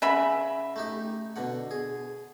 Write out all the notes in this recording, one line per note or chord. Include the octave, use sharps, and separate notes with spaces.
C#3 E5 F#5 A#5 B5
A3 D#4 G4
B2 D3 F#5
G#4